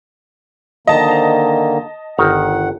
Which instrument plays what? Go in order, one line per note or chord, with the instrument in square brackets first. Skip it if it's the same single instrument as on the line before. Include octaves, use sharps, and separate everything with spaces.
[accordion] D3 D#3 A#3 [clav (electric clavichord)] F3 [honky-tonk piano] D#5 A5
[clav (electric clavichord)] C5 A#5
[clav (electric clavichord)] G1 D#3 A#5 [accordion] F#5